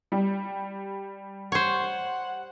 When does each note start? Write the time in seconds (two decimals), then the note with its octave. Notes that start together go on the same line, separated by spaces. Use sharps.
0.12 G3
1.52 C5 C#5 F#5